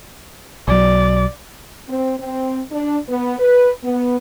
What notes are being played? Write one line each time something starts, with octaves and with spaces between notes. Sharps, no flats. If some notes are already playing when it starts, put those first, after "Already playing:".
B1 F#3 D5
C4
C4
D4
B3
B4
B3